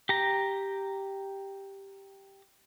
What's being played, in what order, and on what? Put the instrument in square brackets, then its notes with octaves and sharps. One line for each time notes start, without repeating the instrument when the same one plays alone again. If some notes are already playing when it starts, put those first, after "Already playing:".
[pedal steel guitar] G4 A#5